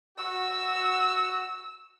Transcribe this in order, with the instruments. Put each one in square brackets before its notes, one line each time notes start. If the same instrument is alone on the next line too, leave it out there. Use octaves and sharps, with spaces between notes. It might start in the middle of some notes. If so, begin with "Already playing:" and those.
[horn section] F#4 [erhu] E6